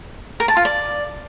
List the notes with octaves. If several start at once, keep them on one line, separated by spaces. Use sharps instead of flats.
A#4
A5
F4
D5